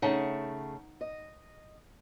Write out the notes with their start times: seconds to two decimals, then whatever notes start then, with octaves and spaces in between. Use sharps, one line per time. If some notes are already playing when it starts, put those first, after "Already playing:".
0.02 C#3 A3 D#4 F#5 A5
1.01 D#5